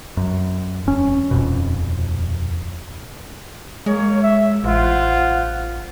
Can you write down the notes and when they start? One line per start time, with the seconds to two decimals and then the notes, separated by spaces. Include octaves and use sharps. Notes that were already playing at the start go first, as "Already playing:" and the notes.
0.17 F#2
0.85 E1 C#4
1.31 D#1 F2 B2
3.86 G#3 A#3 C#5
4.22 E5
4.64 A1 F4 C5 F#5